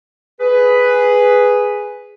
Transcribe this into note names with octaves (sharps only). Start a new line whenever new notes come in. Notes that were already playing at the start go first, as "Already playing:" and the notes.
G#4 B4